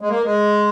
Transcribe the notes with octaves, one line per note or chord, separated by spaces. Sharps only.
G#3
A#3
G#3